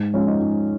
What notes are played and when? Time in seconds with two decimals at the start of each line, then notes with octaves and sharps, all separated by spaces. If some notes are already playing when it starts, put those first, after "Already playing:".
Already playing: G#2
0.14 F3 G#3 C#4
0.27 D#4
0.41 G#2